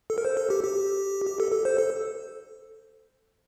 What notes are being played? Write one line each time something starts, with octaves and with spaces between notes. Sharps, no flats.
A4
A#4
C5
A4
G4
G4
G4
A4
A4
C5
A4